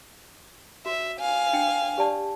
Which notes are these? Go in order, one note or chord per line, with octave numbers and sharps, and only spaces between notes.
F#4 E5
F5 G#5
D4 F#5 G5
G4 D5 A5